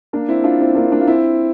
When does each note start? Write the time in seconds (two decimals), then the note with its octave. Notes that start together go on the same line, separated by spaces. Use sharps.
0.13 A#3 D4
0.29 C4 E4
0.44 D4 F4
0.60 C4 E4
0.75 A#3 D4
0.91 A#3 D4
1.01 F4
1.07 C4 E4